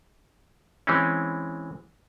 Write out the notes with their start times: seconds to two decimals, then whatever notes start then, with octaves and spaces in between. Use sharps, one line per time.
0.87 E3 G#3 C4 C#4